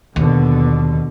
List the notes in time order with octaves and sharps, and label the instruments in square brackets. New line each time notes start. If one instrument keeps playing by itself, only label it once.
[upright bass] D#2 [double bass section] B2 D3